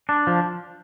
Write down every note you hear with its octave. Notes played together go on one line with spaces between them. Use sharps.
D4
F3